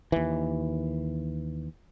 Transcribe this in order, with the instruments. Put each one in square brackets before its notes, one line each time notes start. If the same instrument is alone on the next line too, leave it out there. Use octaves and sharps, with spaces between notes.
[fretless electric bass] D#2 E3